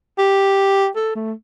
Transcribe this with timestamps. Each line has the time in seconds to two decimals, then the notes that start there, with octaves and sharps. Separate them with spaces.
0.18 G4
0.96 A4
1.15 A3